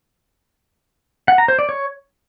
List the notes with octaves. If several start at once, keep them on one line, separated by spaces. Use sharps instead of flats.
F#5
A#5
C5
D5
C#5